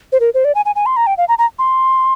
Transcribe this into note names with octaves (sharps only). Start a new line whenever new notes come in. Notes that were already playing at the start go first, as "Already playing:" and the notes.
C5
A#4
C5
D5
G#5
G#5
G#5
C6
A#5
G5
F5
A#5
A#5
C6